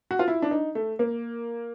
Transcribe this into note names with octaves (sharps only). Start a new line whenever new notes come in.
F#4
F4
E4
D4
D#4
A3
A#3